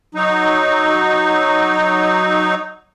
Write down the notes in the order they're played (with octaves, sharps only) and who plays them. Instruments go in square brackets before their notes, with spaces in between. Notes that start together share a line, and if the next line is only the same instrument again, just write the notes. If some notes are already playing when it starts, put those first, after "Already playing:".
[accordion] F#3 D#4